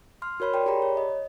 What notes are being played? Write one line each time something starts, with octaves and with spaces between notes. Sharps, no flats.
C6 F6
F#4 A#4 C#5 B5 C6
A#4 C#5 D5 G5
G4 G#4 D5 A#5 B5
C#5
D#5